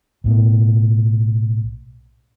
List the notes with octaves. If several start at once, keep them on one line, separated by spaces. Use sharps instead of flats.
B1 A2 B3